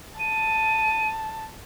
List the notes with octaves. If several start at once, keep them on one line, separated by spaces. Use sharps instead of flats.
A5 D#7